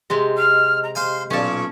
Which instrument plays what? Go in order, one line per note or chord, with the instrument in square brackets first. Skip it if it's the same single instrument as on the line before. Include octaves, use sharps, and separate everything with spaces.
[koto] C3 G#3 C4 [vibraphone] G4 D#5
[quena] F6
A#5
[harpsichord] C5 F5 G#5 [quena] C6
[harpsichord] B1 A#2 [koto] C#4 A5 [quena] C#6